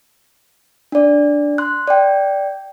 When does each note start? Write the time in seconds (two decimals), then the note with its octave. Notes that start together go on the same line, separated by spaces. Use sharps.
0.92 D4 D5
1.58 C6 F#6
1.87 D5 G5